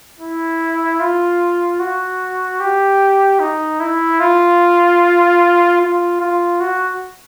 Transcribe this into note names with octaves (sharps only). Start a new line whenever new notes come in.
E4
F4
F#4
G4
D#4
E4
F4
F4
F4
F#4